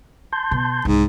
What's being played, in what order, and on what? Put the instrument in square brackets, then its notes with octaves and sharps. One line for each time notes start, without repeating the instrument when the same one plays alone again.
[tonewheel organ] A5 C6 G6
[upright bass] B2
[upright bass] C2 [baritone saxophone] G#2